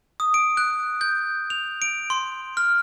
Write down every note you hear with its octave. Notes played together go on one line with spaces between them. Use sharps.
D#6
D7
F#6
G6
F7
D7
C6
F6